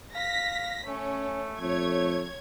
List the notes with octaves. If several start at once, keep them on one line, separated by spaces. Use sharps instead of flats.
F5 A#6 B6
A3 C#4
F2 A3 C#5 G#6